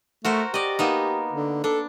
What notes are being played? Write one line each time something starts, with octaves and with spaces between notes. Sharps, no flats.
A3 F#4 A#4 C5
G4 D5 D#5
A#3 B3 D#4
D3
D4 A4